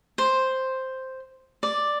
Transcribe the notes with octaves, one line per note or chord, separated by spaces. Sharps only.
C5
D5